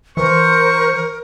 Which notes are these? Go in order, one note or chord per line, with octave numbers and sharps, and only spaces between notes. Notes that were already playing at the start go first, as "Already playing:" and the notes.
E3 A#4 C5 C#6